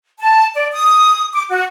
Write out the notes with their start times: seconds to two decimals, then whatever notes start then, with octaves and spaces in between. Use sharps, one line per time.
0.20 A5
0.54 D5
0.72 D#6
1.33 D6
1.49 F#4